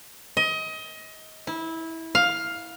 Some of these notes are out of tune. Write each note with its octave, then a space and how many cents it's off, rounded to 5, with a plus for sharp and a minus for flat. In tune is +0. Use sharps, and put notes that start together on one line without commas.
D#5 +25
E4 -20
F5 +10